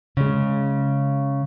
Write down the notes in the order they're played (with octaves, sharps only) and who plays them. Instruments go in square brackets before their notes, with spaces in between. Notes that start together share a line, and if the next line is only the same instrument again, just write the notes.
[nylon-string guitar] C#3 G#3